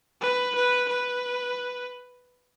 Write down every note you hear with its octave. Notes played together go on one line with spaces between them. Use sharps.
B4
B4
B4